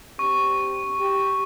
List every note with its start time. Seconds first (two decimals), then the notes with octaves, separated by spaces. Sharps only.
0.19 C4 D4 G4 C#6
1.00 G4